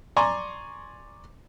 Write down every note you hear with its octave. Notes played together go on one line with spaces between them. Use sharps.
D5 G#5 A#5 C6 C#6